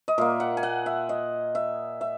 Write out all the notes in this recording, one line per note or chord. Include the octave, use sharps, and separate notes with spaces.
D#5
A#2 A#3 E5
F#5
G#5
F#5
E5
D#5
E5
E5